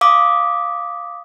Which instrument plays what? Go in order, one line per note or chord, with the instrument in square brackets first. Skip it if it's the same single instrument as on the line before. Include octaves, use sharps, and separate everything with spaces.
[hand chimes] F5 D6 D#6